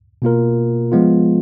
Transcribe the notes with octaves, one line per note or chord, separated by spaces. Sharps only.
B2 A#3 F4 A#4
F3 G#3 B3 F4